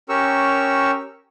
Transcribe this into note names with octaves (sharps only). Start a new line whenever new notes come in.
C#4 G4 A#4 C#6 E6